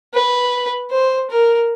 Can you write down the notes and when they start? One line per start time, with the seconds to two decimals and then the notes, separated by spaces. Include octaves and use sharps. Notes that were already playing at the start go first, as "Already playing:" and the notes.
0.14 B4
0.91 C5
1.30 A#4